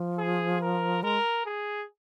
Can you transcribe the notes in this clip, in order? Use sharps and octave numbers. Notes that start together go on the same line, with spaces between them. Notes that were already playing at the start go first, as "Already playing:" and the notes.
Already playing: F3
G#4
A#4
G#3 A#4
G#4